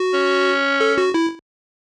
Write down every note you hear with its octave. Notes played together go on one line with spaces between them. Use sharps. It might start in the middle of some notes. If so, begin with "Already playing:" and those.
Already playing: F#4
C#4
A4
F#4
E4